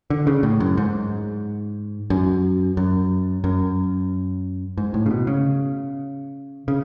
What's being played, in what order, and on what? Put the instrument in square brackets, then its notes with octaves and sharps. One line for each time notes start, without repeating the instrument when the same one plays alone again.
[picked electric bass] D3
C#3
A2
F#2
G#2
F#2
F#2
F#2
G#2
A2
C#3
B2
C#3
C#3